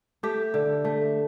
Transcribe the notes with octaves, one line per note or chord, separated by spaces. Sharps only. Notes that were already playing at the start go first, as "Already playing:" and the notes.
A3 G4
D3
A3